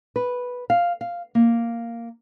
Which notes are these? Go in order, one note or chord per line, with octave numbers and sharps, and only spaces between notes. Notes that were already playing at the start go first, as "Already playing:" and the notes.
B4
F5
F5
A#3